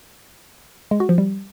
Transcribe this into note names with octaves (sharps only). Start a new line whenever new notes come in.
G#3
F#4
F3
G3